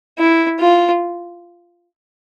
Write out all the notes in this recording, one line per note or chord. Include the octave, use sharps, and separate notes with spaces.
E4
F4